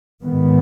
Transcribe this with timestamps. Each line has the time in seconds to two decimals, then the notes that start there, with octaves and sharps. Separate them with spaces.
0.23 G#2 D#3 B3